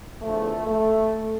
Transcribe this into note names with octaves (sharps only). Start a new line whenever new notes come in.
E2 D3 F3 A3
A3